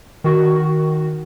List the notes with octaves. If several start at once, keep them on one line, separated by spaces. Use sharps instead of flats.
D#3 F#4